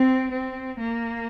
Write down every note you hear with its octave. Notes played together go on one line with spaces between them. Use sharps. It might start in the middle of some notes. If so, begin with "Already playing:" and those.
Already playing: C4
C4
A#3